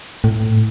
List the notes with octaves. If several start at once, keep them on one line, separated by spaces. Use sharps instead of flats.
A2